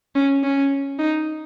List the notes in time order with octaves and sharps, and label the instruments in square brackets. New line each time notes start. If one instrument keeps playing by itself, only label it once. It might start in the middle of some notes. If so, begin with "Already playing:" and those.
[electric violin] C#4
C#4
D#4